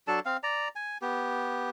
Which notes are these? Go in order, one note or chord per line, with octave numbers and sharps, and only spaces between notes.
F#3 D4 A4 A5
C4 F5
D5 A#5
G#5
B3 G4